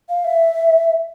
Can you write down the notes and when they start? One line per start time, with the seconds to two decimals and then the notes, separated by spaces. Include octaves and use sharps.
0.09 F5
0.25 E5